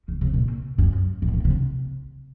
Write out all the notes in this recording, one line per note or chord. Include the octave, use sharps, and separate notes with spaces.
C#3
C3
A#2
F#2
A2
A#2
C3